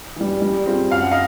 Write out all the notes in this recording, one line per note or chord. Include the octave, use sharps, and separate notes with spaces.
E3 G3
G3
C4 F4 G#4
F#2 F5
F#5
D#5 F5